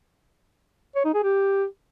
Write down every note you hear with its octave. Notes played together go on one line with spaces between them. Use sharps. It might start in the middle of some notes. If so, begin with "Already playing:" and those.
C#5
D#4
G#4
G4